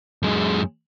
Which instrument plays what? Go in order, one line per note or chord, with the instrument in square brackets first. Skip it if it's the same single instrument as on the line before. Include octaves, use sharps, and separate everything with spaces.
[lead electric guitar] F#2 G#3